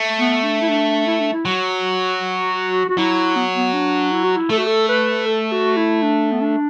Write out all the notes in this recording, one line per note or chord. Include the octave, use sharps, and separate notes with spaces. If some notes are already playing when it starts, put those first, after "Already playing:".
Already playing: A3
B3
D4
E4
D4
E4
D4
E4
F#3 F#4
F#4
F#3 E4
B3
B3
D4
E4
F#4
E4
A3 A4
F#4
A4
B4
A4
F#4
E4
D4
B3
D4